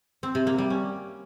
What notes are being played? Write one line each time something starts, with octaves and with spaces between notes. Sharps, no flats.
C4
C3
A#3
G3
C#4